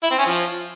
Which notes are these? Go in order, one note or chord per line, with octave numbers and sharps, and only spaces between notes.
E4
C4
C#4
F3